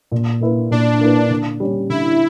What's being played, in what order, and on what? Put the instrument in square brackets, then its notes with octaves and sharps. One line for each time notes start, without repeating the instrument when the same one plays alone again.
[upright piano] A#2
A#3 E4 B4
[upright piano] A#2 [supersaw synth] D4
[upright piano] A#3 E4 B4
D3
G3 C#4
[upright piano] D3 [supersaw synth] E4